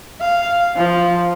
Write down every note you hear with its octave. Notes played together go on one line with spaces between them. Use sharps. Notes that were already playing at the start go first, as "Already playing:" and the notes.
F5
F3